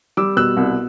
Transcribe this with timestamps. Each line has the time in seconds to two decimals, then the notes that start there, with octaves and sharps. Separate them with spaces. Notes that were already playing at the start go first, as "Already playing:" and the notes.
0.17 G3 D6 E6
0.37 B2 E6 F#6
0.57 C2